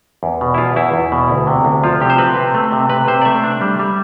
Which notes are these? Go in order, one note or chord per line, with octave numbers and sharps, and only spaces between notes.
E2
B2
E4
E2 F4
E2 E4
E2
B2
D2
C3
D2
F3 F4
C3 G4
C5
C4 B4
C3
A3
C3
C3 B4
C3 C5
D5
A3 E5
D4
G3
G3